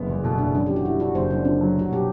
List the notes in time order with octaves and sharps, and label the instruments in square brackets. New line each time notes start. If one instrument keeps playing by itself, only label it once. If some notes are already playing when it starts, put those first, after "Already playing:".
Already playing: [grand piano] F#1 B3
E2
[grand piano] B2 [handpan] A4
[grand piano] F#1 [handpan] D4
[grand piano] F#2 [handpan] D4
[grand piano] E3 [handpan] G4
[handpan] F#4
[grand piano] G3 [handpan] E4
[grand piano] D4 [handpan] F#4
[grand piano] F#1 [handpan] C5
[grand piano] F#2 [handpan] D4
[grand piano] D3 [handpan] C4
[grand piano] F#3
[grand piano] C2 [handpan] F#4
[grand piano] B2 [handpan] G4